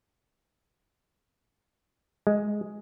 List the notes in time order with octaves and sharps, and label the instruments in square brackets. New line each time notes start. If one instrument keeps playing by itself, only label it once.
[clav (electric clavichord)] G#3